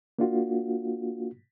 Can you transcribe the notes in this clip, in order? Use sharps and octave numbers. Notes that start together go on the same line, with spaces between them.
A#3 D4 F4 F#4